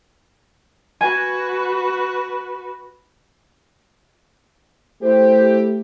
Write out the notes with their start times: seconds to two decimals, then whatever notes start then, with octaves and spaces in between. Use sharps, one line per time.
1.01 F#4 B4 G#5
5.02 A3 E4 G4 C5